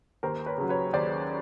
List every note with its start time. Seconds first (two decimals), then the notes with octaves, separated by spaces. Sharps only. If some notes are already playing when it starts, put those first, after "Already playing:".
0.23 D#2 A#4 C5
0.46 B4 C#5
0.58 C#3 F#3
0.69 B4 C#5
0.93 D#2 C5 D5